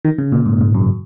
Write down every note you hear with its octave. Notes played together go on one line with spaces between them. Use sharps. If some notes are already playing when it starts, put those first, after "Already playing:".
D#3
C#3
A#2
G#2
G#2
F#2